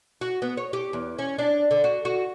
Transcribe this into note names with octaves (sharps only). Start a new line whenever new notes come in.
F#4
B3
C#5
G4
E2
C#4
D4
D3
F#4
F#4